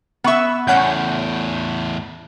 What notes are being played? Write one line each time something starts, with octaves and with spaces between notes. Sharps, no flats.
B3 E5 F#5 C#6 E6
E2 A2 C#4 F#5 G6